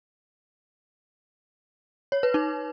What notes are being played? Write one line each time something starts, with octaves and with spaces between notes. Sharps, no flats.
C#5
B4
D#4